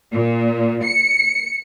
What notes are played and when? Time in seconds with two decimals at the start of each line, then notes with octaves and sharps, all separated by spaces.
0.12 A#2
0.83 C#7